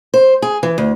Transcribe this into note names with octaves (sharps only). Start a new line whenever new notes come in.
C5
G#4
E3
D2